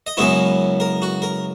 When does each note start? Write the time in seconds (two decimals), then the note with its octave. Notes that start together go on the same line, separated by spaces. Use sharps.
0.07 D#5
0.17 F#2 C#3 G#3 B3 E4 C#5
0.80 A#4
1.02 F#4
1.22 A#4